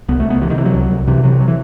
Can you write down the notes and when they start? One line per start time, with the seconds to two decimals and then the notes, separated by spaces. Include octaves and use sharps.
0.08 C2 B3
0.20 A3
0.24 C2
0.30 B3
0.42 C3 E3
0.50 D#3
0.58 C3 E3
0.65 F#3
0.74 C2
0.90 C2
1.08 C3 E3
1.23 C3 F#3
1.40 F#3
1.48 E3